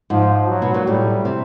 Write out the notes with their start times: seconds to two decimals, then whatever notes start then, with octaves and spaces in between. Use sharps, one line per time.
0.10 G#2 F3
0.48 F#3
0.62 B2
0.74 A#2
0.87 A2 G3
1.25 C3